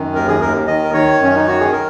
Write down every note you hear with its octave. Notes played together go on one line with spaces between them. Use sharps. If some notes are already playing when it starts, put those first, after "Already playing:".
Already playing: F#2 D#3
D#2 A#4
G#4
D#2 A#4
D#3 D#5
A#4
D#3 C#5
F#2 C#4
D#4
D#3 F#4
G#4
A#4